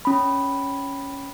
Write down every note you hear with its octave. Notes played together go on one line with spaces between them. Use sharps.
C#4 B5